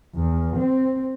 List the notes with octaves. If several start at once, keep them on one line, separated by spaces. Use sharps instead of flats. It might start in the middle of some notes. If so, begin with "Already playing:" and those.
E2
C4